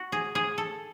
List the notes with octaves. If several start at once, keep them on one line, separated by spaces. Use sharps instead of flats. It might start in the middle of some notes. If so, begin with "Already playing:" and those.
Already playing: F#4
G#4
G#4
A4